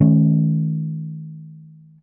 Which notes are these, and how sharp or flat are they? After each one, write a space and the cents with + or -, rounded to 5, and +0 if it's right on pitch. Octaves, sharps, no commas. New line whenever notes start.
D#3 +15 A3 -40 C#4 -10